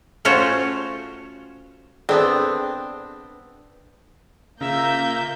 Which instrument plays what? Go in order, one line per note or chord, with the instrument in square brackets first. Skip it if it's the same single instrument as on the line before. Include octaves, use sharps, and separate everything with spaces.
[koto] A3 C#4 F4 F#4 C5 C#5
[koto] B3 D4 [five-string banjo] C4 [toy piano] G#4 A4 D5
[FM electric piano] C#3 [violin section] A#3 G6 [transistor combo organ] F4 A#4 [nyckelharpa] E5